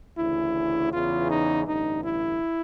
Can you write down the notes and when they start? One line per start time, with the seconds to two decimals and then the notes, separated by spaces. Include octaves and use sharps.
0.18 D2 C#3 E3 E4
0.92 E2 C#3 E3 F4
1.29 D#4
1.66 A1 G2 D3 D#4
2.03 E4